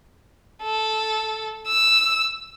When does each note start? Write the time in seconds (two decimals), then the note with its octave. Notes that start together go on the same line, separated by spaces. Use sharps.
0.63 A4
1.67 E6